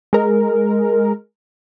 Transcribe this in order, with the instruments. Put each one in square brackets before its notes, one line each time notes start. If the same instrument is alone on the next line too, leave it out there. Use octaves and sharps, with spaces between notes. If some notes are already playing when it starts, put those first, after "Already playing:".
[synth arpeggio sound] G#3 A#4